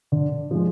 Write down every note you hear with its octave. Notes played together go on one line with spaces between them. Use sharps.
D3
F3 G#3